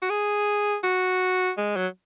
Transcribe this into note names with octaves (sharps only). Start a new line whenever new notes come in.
F#4
G#4
F#4
G#3
F#3